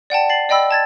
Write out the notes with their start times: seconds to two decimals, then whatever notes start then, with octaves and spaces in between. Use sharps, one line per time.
0.10 D5 F#5 G5 A5
0.29 A6 C7 F#7
0.49 D5 D#5 G5 B5 E6
0.71 A5 G#6 A6